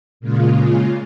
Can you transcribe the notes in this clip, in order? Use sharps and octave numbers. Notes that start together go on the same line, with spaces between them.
A#2 C#3 G#3 F4